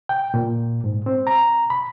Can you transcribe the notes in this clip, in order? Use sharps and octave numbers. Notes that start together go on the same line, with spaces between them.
G5
A#2
G#2
C4
A#5
B5